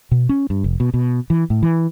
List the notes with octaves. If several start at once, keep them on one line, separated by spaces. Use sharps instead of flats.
B2
C#4
G2
F1
B2
B2
E3
A2
E3